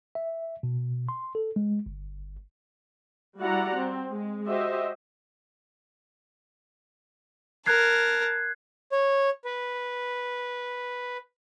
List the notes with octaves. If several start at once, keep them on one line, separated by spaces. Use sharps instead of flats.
E5
B2
C6
A4
G#3
G1
G3 E4 F#4 D5 F#5 A#5
C4
G#3
F#4 G4 C5 D#5 E5
A#4 A5 F#6 G#6 C7
C#5
B4